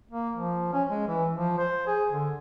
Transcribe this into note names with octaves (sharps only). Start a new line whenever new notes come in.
A#3
F3
C#4
G#3
E3
F3
C5
G#4
D3